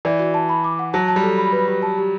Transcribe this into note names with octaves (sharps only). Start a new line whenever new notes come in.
E3 D5
F#4
A5
B5
D6
F#5
F#3 A5
A5
G3
A4
B5
B4
G4
A5
G4